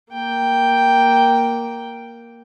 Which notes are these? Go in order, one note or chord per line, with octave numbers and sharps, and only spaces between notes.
A#3 G5